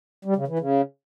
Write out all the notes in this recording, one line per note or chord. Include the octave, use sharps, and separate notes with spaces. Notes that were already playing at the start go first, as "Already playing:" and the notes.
G3
C#3
E3
C#3